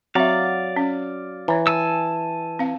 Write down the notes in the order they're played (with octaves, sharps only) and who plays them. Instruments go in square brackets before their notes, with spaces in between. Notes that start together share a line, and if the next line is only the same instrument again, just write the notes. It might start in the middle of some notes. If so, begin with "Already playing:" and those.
[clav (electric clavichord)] F#3 [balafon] C4 E5 [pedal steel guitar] D5 F5
[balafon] C#4
[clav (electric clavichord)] E3 [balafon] C#5 A#5
[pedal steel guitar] G#5 A5 E6
[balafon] C4 F5